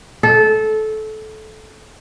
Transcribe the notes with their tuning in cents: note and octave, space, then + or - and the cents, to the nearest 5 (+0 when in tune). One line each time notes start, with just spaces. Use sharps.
A4 -20